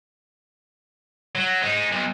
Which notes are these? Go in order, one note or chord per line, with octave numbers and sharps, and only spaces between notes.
F#3
G#3 D#4
B1